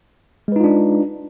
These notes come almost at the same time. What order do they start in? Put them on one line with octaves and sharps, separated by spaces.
G#3 B4 D#4 F4 D4